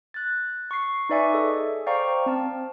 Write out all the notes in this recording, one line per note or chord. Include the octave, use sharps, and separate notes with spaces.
F#6 A6
C#6 C7
D#4 B4 D5 E5 G#5 C#6
G#4 A4 D#5
C5 D5 F5 G5 A#5 C#6
C4 A5